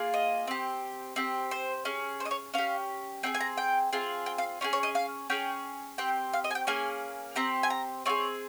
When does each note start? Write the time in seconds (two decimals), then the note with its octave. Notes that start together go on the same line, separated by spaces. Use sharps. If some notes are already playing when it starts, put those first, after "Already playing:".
Already playing: A#3 F4 G#4
0.14 D#5
0.47 C4 G4
1.16 C4 G4
1.51 C5
1.85 C#4 G#4
2.20 C5
2.25 D#5
2.31 C#5
2.54 C#4 G4 F5
3.23 C4 D#4 G#4 G5
3.34 G#5
3.41 A#5
3.57 G5
3.93 C4 F4 G#4
4.26 G5
4.38 F5
4.61 C#4 F4 G#4
4.73 C#5
4.83 D#5
4.95 F5
5.30 C#4 G#4 G5
5.98 C4 G4 G5
6.33 F5
6.44 D#5
6.50 G#5
6.55 G5
6.67 A#3 C#4 G#4 G#5
7.36 C4 G4 A#5
7.63 G#5
7.70 A#5
8.06 C4 F4 C#5
8.09 G#4